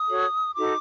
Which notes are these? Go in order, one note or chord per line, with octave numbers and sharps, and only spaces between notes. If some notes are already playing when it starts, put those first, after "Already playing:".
Already playing: D#6
F#4 A4 C#5
D#4 F#4 A4 D6